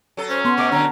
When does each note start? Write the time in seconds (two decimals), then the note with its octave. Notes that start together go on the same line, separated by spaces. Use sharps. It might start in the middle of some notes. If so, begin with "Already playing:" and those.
0.17 F#3 A4
0.29 C#4 C5
0.45 B3 C6
0.57 B2 A3 D5 D6
0.71 D3 F#3 C4 D4 A#5